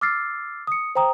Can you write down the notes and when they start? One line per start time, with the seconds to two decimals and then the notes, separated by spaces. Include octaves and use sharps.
0.01 D6 E6 F6 A6 C7
0.67 D#6 C#7
0.95 C5 G5 A#5 D#6